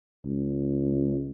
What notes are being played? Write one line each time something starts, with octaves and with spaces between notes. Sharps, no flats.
C#2